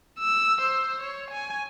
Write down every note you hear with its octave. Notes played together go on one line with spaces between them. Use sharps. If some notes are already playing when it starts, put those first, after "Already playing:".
E6
C5
C#5
G#5